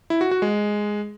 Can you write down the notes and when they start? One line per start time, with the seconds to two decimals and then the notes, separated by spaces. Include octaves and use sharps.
0.10 E4
0.21 F#4
0.31 F#4
0.42 G#3